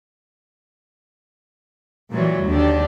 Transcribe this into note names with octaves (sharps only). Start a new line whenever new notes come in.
A#2 E3 F#3 G3
D#2 D3 D4 G4